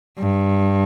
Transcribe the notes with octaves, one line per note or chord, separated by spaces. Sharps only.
G2